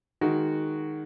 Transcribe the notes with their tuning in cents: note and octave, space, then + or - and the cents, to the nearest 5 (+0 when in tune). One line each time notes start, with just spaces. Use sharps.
D#3 +0 G#3 +0 F#4 +0